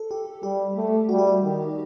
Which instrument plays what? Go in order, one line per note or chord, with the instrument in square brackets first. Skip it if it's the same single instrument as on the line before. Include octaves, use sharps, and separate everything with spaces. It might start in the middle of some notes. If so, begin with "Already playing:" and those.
Already playing: [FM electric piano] A4
G4
[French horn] G3 [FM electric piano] G4
[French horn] A3
[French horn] G3 [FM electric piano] F#4
[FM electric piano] G4
F#4
[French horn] D#3